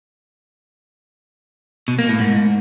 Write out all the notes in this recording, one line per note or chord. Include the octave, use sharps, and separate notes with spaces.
B2
A#3
A2
G#2